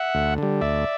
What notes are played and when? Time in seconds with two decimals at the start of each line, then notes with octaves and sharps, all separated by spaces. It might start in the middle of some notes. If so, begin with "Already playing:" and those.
Already playing: E5 F#5
0.15 D2
0.38 D3 G3
0.61 D2 D5 E5